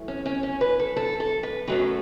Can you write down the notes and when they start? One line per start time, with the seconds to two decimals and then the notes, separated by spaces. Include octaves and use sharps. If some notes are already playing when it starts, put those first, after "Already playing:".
Already playing: F#2 E3 A3
0.08 C#4
0.26 C#4
0.43 C#4
0.61 B4
0.80 A4
0.96 A4
1.20 A4
1.43 B4
1.67 F#2 D#3 F#3 A3 B4